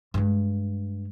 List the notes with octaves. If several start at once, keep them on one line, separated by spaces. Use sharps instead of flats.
G2 G#3